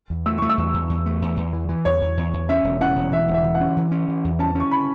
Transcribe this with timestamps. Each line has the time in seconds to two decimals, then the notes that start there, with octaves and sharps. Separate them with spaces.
0.10 E2
0.26 A3 E6
0.38 A3 C#6
0.49 E6
0.58 E2
0.74 E2
0.90 E2
1.06 A3
1.22 E2
1.37 E2
1.53 E3
1.69 E3
1.85 E2 C#5
2.02 E2
2.17 E2
2.33 E2
2.49 C#4 E5
2.64 E1
2.81 C#4 F#5
2.96 E1
3.12 E3 E5
3.28 E1
3.34 E5
3.44 E3
3.55 F#5
3.61 C#4
3.77 E3
3.91 C#4
4.08 E3
4.24 E2
4.39 C#4 A5
4.55 C#4 C#6
4.71 B5